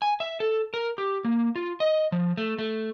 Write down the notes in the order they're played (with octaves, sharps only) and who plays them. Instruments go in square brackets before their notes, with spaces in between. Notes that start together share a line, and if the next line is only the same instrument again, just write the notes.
[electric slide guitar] G#5
E5
A4
A#4
G4
A#3
F4
D#5
F3
A3
A3